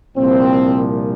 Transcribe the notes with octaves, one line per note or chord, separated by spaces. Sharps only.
C2 A#2 F3 C4